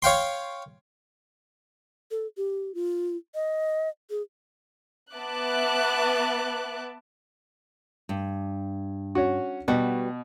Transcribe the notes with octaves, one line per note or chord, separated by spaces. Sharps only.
C#5 F5 G5 C6
A4
G4
F4
D#5
G#4
B3 E5 A5 D6 F#6
G2
C#4 F#4
B2 G3 F#4 B4